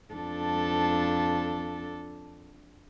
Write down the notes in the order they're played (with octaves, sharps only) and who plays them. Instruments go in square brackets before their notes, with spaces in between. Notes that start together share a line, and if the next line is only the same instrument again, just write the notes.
[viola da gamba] F2 D4 A4